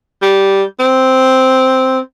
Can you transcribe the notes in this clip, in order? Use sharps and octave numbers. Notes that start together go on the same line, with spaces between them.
G3
C4